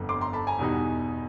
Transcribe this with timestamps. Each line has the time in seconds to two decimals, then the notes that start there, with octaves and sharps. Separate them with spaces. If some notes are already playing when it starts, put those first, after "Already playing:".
Already playing: G1 F2 D3 B3
0.09 C6 D6
0.21 A#5 C6
0.33 A5 B5
0.47 G#5 A#5
0.59 E2 B2 G3 B3 D#4